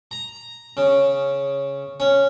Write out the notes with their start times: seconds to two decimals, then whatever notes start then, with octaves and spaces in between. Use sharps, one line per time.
0.11 A#5
0.77 C#3
2.00 C#4